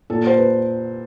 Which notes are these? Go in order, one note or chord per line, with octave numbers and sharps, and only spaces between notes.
A#2 A4
C5
B4